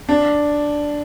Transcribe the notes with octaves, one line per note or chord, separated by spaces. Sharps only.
D4